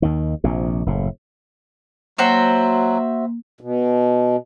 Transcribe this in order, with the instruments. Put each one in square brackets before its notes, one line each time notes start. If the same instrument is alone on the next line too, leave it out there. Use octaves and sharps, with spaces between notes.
[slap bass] D#2 D#3
A#1 C3
F#1 A2
[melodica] F#3 [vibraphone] A#3 [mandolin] F#4 C5 E5
[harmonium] B2